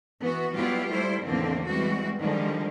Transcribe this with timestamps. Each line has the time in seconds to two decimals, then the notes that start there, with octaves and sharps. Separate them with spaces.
0.20 E3 B3 F#4
0.56 F#3 G3 B3 E4 F4 G4
0.90 G3 A3 E4 C5
1.26 E2 A2 D3 D#3 A#3 C4
1.67 E3 G3 G#3 C4 F#4
2.19 D3 D#3 F3 G3 G#3